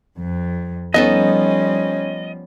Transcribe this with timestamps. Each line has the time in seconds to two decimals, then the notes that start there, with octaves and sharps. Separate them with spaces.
0.17 F2
0.94 F3 G3 B3 C#4 D#4 A4 D#5